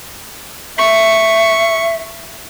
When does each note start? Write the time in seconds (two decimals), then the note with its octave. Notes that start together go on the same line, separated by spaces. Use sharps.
0.78 E5 C#6